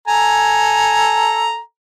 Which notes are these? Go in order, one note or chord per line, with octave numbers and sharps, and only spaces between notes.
A4 G#5 A#5